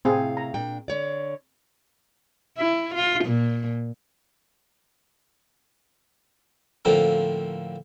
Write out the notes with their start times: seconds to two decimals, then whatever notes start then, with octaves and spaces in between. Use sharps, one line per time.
0.05 A2 C3 C4 G#4 F5
0.37 A#5
0.54 A#2 D4 G5
0.88 D3 C#5 D5
2.58 E4
2.95 F4
3.25 A#2
6.85 A2 D3 F3 A#3 C4